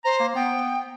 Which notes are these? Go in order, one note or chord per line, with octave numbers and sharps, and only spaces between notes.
C5 A#5
A#3
B3 G5